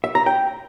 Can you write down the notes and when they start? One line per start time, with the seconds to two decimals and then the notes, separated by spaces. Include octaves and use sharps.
0.04 E5
0.15 A#5
0.26 G5